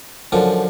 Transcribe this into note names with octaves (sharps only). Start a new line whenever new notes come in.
F#2 D3 F3